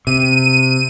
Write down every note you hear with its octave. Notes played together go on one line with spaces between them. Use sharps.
C3 D#7